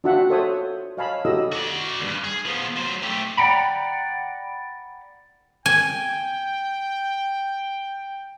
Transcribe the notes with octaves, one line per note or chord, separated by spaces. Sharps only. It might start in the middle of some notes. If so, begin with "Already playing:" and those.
D4 F4 F#4 E5 F#5 G5
A4 C5 C#5 E5 A5 D#6
C#5 D#5 F5 G#5 A5 B5
E4 F#4 G4 A4 D#5 E6
F#4 D5
D2 G2
G#4
F3 B3
F#3 C5
A3 G4
D5 F#5 G5 A#5 B5
G5 G#5